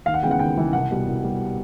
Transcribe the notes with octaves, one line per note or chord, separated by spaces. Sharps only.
D#2 F5
F#5
C#3 E3 G#3 B3 G5
F#5
D#2 G5
C#3 E3 G#3 B3
C2 F#5
B2 G3
C2
B2 G3